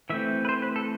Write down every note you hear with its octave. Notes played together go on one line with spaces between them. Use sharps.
E3 A3 C4 E5
B4
C5
B4
A4